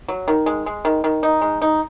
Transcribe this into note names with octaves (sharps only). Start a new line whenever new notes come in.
F#3
D#3
G#3
G#3
D#3
D#3
D#4
G#3
D#4